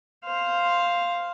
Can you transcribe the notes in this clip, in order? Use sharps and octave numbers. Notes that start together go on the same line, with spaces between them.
C5 F5